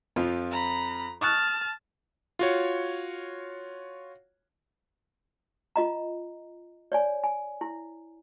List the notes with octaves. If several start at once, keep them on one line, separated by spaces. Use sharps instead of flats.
F2 F3 F4
A#5 B5
A5 C#6 D#6 F6 F#6
F4 F#4 C#5
F4 D#5 A#5
C#5 D5 G#5
G#5
E4